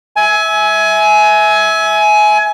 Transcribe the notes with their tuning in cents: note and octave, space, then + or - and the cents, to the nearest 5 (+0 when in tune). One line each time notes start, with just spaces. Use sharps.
E5 -20 G#5 +20